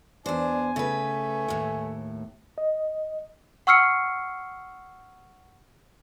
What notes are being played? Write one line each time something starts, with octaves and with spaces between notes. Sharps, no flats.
E2 D4 C5 G#5
C#3 A3 B4
D#2 A2
D#5
F#5 C#6 E6 F6 C7 C#7